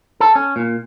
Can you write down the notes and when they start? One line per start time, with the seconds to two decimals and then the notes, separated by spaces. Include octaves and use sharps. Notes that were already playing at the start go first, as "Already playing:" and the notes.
0.20 A4
0.35 C#4
0.56 A#2